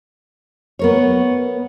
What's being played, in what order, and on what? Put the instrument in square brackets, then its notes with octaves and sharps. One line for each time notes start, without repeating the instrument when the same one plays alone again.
[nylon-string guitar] B3 A#4 C#5